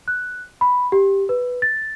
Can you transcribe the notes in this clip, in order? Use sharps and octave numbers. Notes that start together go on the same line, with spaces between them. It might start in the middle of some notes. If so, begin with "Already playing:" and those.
F#6
B5
G4
B4
A6